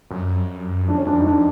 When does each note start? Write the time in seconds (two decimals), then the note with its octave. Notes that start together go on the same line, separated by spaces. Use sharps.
0.11 F#2
0.88 F2 D4
0.98 C#4
1.07 D4
1.20 D#4
1.26 D4